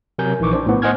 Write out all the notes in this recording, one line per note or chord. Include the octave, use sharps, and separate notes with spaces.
C3 F#3 A#4 G#5 G6
A#1 E3 D#4 C#6 D6
D4 C5
A2 B3
C5 D#5 F#5 G#5 F6 G#6